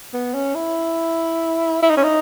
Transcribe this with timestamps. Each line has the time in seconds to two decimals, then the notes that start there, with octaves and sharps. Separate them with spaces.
0.13 B3
0.34 C#4
0.55 E4
1.82 E4
1.90 D#4
1.97 C#4
2.03 D#4